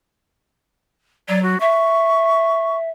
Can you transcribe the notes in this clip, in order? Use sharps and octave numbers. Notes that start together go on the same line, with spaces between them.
F#3 D5
F#4
E5 C#6